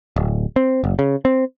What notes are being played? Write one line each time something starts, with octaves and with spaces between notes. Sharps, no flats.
D1
C4
F#1
C#3
C4